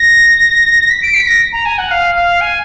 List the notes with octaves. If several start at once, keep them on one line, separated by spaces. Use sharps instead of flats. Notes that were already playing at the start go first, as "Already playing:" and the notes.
Already playing: A#6
B6
D7
B6
A#6
A#5
G#5
F#5
F5
F5
G#5